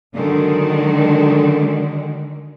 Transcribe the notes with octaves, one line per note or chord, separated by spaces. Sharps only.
D3 D#3 F#3 G#3